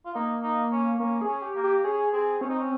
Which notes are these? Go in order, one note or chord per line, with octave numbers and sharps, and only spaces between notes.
F4
A#3 D#4
D#4
C#4
A#3 C#4
G#4
C#4
G4
A#3
G4
C#4 G#4
C4 G#4
C4 C#4
D#4
C#4